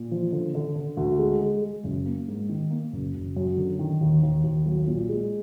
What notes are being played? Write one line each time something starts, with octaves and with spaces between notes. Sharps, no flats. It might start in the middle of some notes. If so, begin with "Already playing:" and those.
Already playing: A#2
F3
D3
D3
D3
D2
G#3
G#3
G#3
F#1
A#3
G#2
D#3
A#3
F#1
F#1
F#2
D3
D#3
D#2
D#2
D#2
B1
A#2
G#3